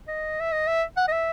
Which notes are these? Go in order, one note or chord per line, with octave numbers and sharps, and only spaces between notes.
D#5
E5
D#5
E5
F#5
D#5
E5